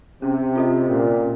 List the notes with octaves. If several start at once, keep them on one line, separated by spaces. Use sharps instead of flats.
C3 C#4
F4 A4 D#5
A#2 C#4